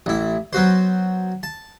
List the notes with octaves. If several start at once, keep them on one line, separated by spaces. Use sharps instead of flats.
A1 E4
F#3 B3 F#4 C5
A5